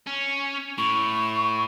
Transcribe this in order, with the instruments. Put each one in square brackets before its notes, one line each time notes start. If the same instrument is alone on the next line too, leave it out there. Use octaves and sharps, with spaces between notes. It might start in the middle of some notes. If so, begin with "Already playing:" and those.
[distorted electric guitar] C#4
[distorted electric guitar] A2 [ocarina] C#6